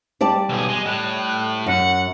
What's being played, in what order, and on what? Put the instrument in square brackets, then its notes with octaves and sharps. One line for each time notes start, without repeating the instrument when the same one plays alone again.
[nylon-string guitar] G3 D5 A5
[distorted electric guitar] B1 G#4
G#3
[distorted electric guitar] A2 [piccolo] F#6
[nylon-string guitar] F#2 [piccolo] F#5